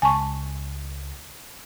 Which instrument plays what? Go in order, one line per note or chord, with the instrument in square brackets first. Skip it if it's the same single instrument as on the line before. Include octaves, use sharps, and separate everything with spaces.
[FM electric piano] C#2 [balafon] G#5 A5 C#6